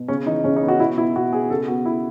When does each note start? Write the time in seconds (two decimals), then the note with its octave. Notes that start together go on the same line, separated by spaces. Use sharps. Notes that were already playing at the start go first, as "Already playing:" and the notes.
Already playing: B2
0.08 C#3 C#4
0.26 E3 D#4
0.44 C#3 C#4
0.56 D#4
0.62 B3
0.68 F#4
0.79 B2 E4
0.98 B2 E4
1.16 B2 F#4
1.33 B2 G#4
1.50 C#3 A4
1.68 B3 F#4
1.85 B3 E4